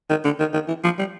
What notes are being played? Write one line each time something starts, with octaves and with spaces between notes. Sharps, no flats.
D#3
D3
D#3
D#3
E3
F3
G3